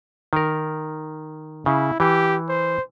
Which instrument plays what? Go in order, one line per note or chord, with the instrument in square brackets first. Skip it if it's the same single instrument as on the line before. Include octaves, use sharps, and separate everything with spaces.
[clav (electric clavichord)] D#3 A#4
[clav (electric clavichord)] C#3 [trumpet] E4
[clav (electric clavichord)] E3 [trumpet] G4
[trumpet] C5